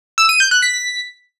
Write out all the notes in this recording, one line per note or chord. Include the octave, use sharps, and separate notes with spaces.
E6
D#7
G6
F#6
B6